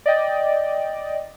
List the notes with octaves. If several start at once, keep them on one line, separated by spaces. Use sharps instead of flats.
D5 D#5 G5